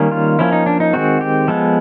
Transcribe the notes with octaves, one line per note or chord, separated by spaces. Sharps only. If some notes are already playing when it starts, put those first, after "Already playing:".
Already playing: D#3 G3 A#3 C#4
F4
F3 A#3 C#4 E4
D#4
D4
D#4
D#3 G#3 C4 F#4
G4
F3 G#3 B3 A4